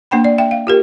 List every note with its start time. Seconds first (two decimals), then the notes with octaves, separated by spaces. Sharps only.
0.11 A#3 D4 F#5 G5 B5
0.24 D5
0.38 E5 G5
0.51 F5
0.67 F4 G4 A#4